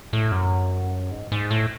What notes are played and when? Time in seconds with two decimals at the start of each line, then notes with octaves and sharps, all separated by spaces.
0.13 A2
0.32 F#2
1.11 G#2
1.32 G#2
1.51 A2